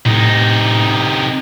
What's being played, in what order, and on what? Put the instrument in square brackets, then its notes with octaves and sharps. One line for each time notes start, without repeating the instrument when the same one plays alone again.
[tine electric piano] A2 [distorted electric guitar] C3 D#4